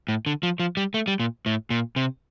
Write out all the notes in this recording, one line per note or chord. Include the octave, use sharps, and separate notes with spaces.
A2
D3
F3
F3
G3
A3
G3
A#2
A2
A#2
C3